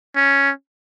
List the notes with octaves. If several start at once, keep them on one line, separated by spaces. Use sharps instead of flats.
C#4